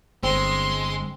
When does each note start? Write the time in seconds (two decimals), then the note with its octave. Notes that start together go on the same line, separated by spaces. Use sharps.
0.23 G1 G#3 C4 C6